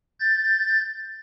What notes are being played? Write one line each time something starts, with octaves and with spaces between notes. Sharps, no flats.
G6 A6